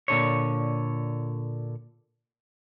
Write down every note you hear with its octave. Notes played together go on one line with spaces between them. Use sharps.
A#2 D3 C#5